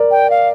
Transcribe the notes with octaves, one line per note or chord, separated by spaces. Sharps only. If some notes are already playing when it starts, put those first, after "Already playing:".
Already playing: A#4 D5
G5
F5